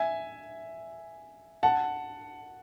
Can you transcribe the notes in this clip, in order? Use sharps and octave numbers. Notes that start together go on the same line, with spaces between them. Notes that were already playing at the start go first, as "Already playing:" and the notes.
Already playing: E5 G#5
F#5 A5